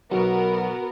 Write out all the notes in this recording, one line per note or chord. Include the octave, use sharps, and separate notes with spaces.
B1 B3 F#4 A#4